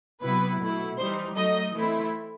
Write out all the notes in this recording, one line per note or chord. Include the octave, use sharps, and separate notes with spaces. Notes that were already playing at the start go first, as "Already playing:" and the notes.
C3 F#3 B3 E4 B4
B2 A3 E4
E3 G3 D#4 C5
F#3 A3 D#4 D#5
E3 A3 C4 E4